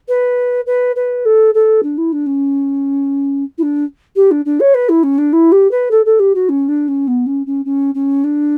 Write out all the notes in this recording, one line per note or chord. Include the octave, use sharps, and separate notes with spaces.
B4
B4
B4
A4
A4
D4
E4
D4
C#4
E4
D4
G4
D4
D4
C#5
B4
E4
C#4
D4
E4
G4
B4
A4
A4
G4
F#4
C#4
D4
C#4
B3
C#4
C#4
C#4
C#4
D4